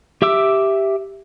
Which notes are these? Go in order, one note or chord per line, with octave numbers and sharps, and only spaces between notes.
G4 E5 D6 E6